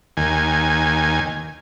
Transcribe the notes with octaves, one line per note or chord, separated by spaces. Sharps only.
D#2 G#5